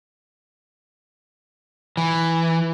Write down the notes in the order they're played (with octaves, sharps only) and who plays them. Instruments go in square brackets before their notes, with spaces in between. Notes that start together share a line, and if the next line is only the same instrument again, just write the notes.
[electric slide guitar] E3